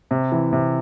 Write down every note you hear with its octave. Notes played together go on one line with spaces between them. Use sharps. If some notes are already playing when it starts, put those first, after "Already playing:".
C3
E3
C3